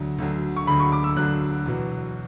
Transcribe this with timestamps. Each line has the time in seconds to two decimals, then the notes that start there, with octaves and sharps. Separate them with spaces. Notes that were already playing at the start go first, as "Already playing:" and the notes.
Already playing: D2 D3 F#3
0.18 D2 D3 F#3
0.57 C#6
0.67 D2 D3 F#3 B5
0.80 C#6
0.92 D6
1.04 E6
1.17 D2 D3 F#3 F#6
1.66 E2 B2 F#3